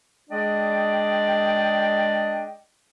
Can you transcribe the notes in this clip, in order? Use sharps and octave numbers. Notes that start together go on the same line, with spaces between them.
G#3 D4 G#4 D5 D#5 G5